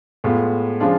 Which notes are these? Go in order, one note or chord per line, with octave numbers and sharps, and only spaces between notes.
A2 G#3 B3 F4
C#3 F3 G#3 D4 F4